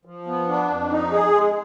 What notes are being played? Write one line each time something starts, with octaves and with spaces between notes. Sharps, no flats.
F3
B3
D4
F2
D#4
G#4
G#3